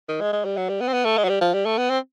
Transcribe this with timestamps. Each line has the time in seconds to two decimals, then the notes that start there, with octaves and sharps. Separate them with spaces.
0.08 D#3
0.21 G#3
0.33 G#3
0.45 G3
0.57 F#3
0.69 G3
0.81 B3
0.88 C4
0.93 B3
1.05 A3
1.17 G#3
1.24 F#3
1.29 G3
1.41 F3
1.54 G3
1.66 A3
1.78 B3
1.90 C4